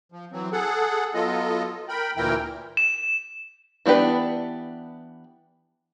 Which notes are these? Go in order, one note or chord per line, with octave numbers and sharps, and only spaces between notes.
F3
E3 F#3 C4
G#4 A4 F#5
F#3 B3 F4 A4 D#5
A#4 G5 B5
D2 A#2 E3 E4 A#4 G5
E7
E3 B3 D4 G4 B4